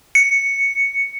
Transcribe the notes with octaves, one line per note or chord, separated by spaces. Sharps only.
C#7